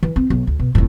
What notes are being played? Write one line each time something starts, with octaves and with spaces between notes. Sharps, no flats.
E3
C4
B1
D2
B2
F1 A2